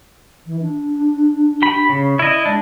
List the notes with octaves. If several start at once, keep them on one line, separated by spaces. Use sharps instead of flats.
E3
D4
G4 B5
C#3
E4 D5 D#5
G#3 D4